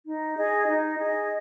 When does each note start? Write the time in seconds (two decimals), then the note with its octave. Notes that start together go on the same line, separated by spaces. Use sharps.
0.06 D#4
0.37 G#4 D#5
0.67 D#4
0.99 G#4 D#5